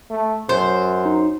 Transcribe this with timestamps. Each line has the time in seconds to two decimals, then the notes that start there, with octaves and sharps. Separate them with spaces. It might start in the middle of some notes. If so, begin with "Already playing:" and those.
0.10 A3
0.49 F#2 C5
1.06 D#4